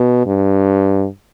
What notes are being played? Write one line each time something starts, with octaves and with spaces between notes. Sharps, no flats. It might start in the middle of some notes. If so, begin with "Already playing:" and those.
Already playing: B2
G2